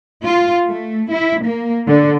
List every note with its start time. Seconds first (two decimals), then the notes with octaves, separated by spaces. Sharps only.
0.24 F4
0.68 A3
1.11 E4
1.43 A#3
1.88 D3